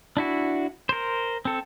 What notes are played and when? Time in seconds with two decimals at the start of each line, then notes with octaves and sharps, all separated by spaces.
0.17 D4 E4 F#4
0.89 A#4 C5
1.45 C4 A4